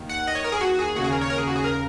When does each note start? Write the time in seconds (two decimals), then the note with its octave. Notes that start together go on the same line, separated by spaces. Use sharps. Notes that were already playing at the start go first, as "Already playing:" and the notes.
Already playing: D#2 D#3
0.09 F#5
0.27 D#5
0.35 C#5
0.44 A#4
0.52 G#4
0.61 F#4
0.79 G#4
0.96 D#2 C#3 F#4
1.04 G#4
1.12 A#4
1.21 C#5
1.30 A#4
1.38 G#4
1.47 F#4
1.56 G#4
1.64 A#4